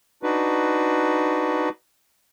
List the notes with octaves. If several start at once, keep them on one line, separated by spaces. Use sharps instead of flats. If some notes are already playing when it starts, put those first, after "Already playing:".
D4 D#4 F#4 B4